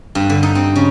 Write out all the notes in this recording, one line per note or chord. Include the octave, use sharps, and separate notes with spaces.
G2
D3
D#4
C4
C#3